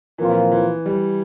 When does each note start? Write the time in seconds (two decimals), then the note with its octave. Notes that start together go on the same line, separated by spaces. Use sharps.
0.18 A#2 E3 F3 C4 F4 A#4
0.52 E3
0.86 G3